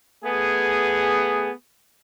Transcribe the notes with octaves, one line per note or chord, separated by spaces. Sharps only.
A3 B3 G#4